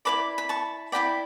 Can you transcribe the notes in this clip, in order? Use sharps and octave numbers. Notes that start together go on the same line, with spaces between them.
E4 B4 D5 B5 D6
B5
A5 C#6
E4 G4 D5 G5 B5